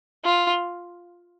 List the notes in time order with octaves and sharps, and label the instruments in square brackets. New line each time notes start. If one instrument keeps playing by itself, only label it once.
[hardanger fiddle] F4